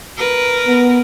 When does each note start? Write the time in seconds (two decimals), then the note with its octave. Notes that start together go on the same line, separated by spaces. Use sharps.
0.17 A#4 B4
0.67 B3